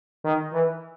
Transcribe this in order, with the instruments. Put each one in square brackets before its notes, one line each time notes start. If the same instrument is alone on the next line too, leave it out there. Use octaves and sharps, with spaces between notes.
[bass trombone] D#3
E3